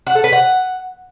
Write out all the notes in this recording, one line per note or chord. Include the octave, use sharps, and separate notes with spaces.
F#5
A4
B4
F#5